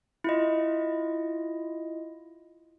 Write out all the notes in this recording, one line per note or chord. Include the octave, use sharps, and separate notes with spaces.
E4 F4 D#5